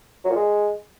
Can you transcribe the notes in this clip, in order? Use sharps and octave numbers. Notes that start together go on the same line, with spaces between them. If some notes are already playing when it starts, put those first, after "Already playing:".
F#3
A#2
G#3